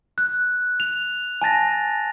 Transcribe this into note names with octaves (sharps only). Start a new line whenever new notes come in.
F#6
F7
G#5 A5 A6 A#6